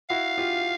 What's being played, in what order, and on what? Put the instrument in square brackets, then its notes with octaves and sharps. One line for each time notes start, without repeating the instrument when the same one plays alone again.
[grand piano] E4 F#4 [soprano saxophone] F5
[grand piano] F4 G4